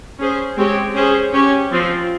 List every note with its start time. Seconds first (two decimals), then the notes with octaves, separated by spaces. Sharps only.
0.19 C#4 G#4 C5
0.56 G#3 C4 G4 C#5
0.94 C#4 G#4 C5
1.32 C#4 G4 C#5
1.71 F3 C4 F4